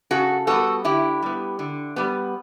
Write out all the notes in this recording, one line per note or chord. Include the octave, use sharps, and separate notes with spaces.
C#3 F#4 A4
G3 B3 F#4 A4
D3 E4 G4
G3 B3
D3
G3 B3